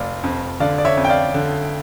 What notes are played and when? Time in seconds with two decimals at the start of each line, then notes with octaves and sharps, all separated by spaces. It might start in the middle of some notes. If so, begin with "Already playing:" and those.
Already playing: F1 D5 F5
0.23 F2
0.60 D3 D5 F5
0.78 D5
0.85 C#5 E5
0.97 F2
1.05 G5
1.09 D5 F5
1.34 D3